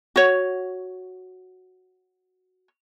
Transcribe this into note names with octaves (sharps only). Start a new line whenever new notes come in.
F#4 C#5